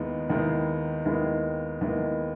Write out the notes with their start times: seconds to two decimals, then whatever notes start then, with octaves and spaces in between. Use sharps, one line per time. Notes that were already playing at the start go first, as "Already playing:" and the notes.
Already playing: D#2 D#3 G#3 B3 E4
0.29 D#2 D#3 G#3 B3 E4
1.05 D#2 D#3 G#3 B3 E4
1.81 D#2 D#3 G#3 B3 E4